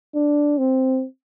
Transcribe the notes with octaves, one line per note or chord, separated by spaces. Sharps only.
D4
C4